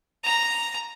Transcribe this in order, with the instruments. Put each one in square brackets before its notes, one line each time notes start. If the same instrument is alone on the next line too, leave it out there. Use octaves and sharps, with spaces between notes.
[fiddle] A#5